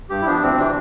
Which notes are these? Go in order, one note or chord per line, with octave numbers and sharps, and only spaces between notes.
G2 G4
E4
F3 B3 D4
D2 C4
C3 E3 D4